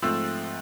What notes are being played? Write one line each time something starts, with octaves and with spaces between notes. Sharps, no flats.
G#2 F3 A3 C4 E6